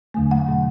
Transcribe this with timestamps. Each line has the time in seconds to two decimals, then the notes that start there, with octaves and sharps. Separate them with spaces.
0.14 E2 D3 F#3 A3 G#5
0.31 F#5
0.48 B2 F#3 A3